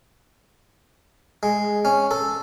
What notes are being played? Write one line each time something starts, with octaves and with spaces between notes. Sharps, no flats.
G#3
C#4
A4